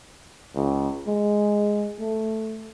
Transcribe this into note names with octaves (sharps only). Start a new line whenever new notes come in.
C#2
G#3
A3